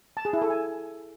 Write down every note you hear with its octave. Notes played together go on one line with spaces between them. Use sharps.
A5
G#4
E4
A4
G#5